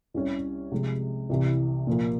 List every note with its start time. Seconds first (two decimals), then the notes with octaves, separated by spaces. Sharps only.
0.14 C2 C3 G3 C#4 G4
0.71 C3 F3 G#3
1.29 C2 C3 E3
1.87 A#2 F3 A#3